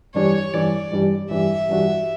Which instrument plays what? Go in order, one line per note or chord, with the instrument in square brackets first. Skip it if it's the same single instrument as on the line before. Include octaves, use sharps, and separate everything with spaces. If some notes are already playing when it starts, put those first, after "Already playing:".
[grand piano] G2 E3 G3 D4 [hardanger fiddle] C#5
[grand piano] G2 E3 G3 D4 [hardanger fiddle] D5
[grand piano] G2 E3 G3 D4
[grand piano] G2 E3 G3 D4 [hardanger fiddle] E5
[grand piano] G2 E3 G3 D4 F#4